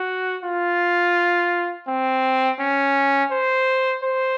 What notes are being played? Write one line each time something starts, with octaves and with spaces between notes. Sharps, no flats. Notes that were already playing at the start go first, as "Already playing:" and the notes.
Already playing: F#4
F4
C4
C#4
C5
C5